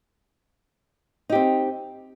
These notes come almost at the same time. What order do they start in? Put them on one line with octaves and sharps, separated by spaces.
D#4 G4 C4